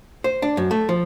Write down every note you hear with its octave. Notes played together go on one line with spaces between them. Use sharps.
C5
D4
F#2
A3
F3